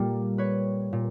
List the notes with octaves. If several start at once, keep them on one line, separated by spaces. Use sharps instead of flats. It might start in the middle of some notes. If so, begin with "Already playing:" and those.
Already playing: A#2 G3 A#3 G4 A4
B4 C#5
A#2